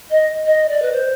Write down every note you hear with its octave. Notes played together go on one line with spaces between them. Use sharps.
D#5
D#5
D5
B4
C5